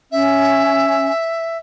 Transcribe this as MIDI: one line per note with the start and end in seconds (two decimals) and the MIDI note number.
0.12 1.10 61
0.12 1.58 76